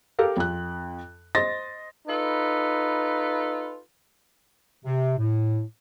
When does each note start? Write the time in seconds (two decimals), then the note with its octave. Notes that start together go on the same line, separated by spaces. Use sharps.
0.19 G4 A4 A#4 F5
0.37 F2 F#6
1.35 C5 D#5 C6 A6 A#6
2.07 D#4 F4 A4 B4
4.85 C3
5.18 A2